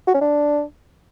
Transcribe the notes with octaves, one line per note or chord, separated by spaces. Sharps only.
F#4
C#4
D4